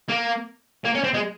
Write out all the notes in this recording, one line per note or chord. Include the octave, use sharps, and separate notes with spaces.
A#3
A#3
C#4
C4
G#3